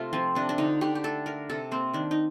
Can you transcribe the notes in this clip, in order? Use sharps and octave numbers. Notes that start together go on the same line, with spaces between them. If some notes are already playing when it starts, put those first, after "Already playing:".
Already playing: C3 A3 F4
F3 C4
C3 D4
D4
D3 D#4
D3 G4
G4
A3 A4
A3 A#4
C3 A4
A#3 C4
D#3 D4
D#4